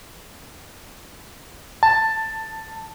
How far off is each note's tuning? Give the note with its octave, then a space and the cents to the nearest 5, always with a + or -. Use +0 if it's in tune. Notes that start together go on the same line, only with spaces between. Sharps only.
A5 +10